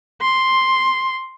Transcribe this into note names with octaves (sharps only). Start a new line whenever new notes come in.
C6